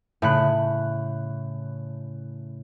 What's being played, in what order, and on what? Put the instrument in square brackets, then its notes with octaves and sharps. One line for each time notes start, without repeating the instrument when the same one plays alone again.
[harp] A2 C#3 F#6